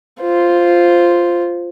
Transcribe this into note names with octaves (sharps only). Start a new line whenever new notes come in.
F4 C5